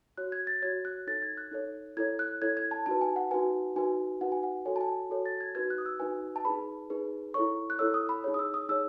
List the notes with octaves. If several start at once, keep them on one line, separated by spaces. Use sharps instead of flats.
F#4 C#5 F#6
G#6
A6
F#4 C#5 G#6
F#6
D#4 A4 C#5 A6
G#6
F#6
D#4 A4 C#5
E4 A4 C#5 G#6
F#6
E4 A4 C#5 G#6
G#6
A5
D#4 F#4 B4 A5
G#5
F#5
D#4 F#4 B4 G#5
D#4 F#4 B4 G#5
D#4 F#4 B4 F#5
G#5
F#5
F#4 A4 C#5 G#5
A5
G#5
F#4 A4 C#5
A6
G#6
D#4 F#4 B4 G#6
F#6
D#6
E6
D#4 F#4 B4 G#5
A5
D#4 G#4 B4 B5
D#4 G#4 B4
E4 A4 C#5 C#6
F#6
E4 A4 C#5 E6
D#6
B5
D#4 G#4 C#5
D#6
E6
D#6
D#4 G#4 C#5 E6